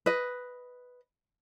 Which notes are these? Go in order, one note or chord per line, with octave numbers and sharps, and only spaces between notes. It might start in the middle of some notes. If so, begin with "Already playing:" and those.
B4 D#5